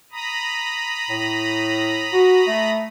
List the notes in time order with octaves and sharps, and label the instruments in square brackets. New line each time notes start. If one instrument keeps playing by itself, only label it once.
[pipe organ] A#5 B5 D#6
[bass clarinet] A2
F#4
A3